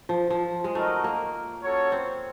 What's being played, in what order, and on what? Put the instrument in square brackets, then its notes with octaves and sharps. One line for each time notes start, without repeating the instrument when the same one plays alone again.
[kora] F3
F3
G#3
[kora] A3 [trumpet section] D#4 F#4 A#4 D#5
[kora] A#3
[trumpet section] C#4 F#4 A4 C#5
[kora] C4